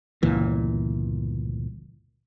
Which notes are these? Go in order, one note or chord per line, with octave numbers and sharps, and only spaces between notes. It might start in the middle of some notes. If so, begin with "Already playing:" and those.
G1 C#2 A#2 E3